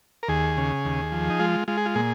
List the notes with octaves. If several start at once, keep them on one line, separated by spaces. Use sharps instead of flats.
A#4
D#2 G#4
C#3
D#2
F3
D#4
G#3 F4
G#3 F4
G#4
F4
A#2 G#4